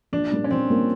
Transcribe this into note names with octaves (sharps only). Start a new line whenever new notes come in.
A#1 D4
A#2 G3 A#3
C#4
A#1 C4
A#2 G3 A#3